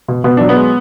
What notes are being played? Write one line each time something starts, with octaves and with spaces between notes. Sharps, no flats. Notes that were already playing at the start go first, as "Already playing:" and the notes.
B2
B2 B3
F#3 D4
B3
G#3